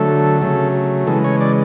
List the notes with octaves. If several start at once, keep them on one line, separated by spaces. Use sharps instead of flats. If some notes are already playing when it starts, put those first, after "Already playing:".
Already playing: D3 F#3 A3 A4
C#3 F#3 A3
C#3 E3 G#3 A4
C#5
D5